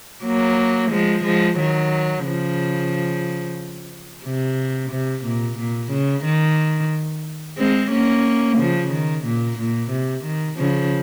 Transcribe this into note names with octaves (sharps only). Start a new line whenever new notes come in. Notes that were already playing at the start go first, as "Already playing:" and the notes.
F#3 A#3
F3 G#3
F3 G#3
D#3 F#3
C#3 F3
C3
C3
A#2
A#2
C#3
D#3
G#3 C4
A#3 C#4
C#3 F3
D#3
A#2
A#2
C3
D#3
C#3 F3